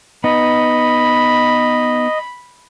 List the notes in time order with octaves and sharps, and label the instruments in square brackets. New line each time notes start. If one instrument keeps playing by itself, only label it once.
[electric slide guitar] B3 D#4 [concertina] D#5 [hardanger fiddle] B5